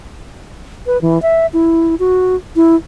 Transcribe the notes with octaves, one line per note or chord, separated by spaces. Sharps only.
B4
E3
E5
E4
F#4
E4